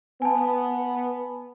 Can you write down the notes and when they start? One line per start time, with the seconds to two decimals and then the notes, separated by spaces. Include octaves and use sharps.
0.22 B3 G#5 A5